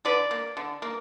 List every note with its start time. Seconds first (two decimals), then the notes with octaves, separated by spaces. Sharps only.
0.05 D3 B4 D5
0.31 A#3
0.57 D3
0.82 A#3